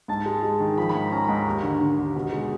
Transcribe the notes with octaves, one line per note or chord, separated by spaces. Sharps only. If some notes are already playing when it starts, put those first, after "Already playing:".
G#2 A5
G#3
G#3
D#3
F3 B5
B5
G#2
A#5
C#4 A#5
G#2 B5
A#5
D#2
D3
D3
D#2
B2
G#3